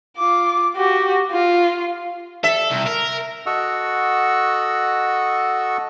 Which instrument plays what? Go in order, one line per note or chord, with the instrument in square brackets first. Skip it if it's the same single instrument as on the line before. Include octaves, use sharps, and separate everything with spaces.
[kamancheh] F4 D6
F#4 G4
F4
[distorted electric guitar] A4 [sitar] E5
[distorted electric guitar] C2
A#4
[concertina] F#4 A4 D#5 F#5 C#6 E6